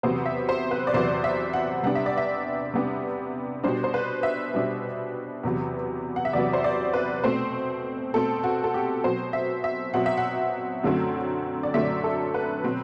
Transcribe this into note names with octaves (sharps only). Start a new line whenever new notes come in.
E2 C3 F#3 B3 C5
E5
C5
B4
D5
E2 C3 F#3 B3 C5
E5
F#5
C3 G3 B3 D4 F#5
E5
D5
E5
C3 G3 B3 D4
B2 G3 D4 C5
C5
B4
E5
B2 G3 D4
E2 C3 F#3 B3
F#5
E5
E2 C3 F#3 B3 D5
C5
D5
B4
B2 A3 C4 C5
B2 A3 C4 A4
F#4
A4
G4
B2 F#3 C4 C5
E5
E5
B2 F#3 C4 F#5
E5
F#5
F#2 D3 F#3 A3 C4
D5
F#2 D3 F#3 A3 C4 E5
A4
B4
B2 F#3 C4